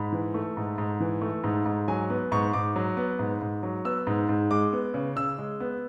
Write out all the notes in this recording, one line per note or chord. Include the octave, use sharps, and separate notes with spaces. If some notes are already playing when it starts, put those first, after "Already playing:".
Already playing: G#2 B5
E3
A3
G#2
G#2
E3
A3
G#2
G#2
F#3 G#5
B3
G#2 C#6
G#2 D6
F#3
B3
G#2
G#2
F#3
B3 E6
G#2
G#2
G#3 D6
B3
C#3
C#3 E6
G#3
B3